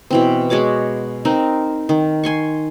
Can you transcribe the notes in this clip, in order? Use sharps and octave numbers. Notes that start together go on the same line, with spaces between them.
B2 E3 C4
G#3 F#4 C#5 D6
C4 D#4 A#4
D#3
G#5 C6 C#6